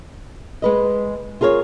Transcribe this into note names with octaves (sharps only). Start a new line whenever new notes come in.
G#3 B4 D#5
F4 G#4 A#4 B4 C#5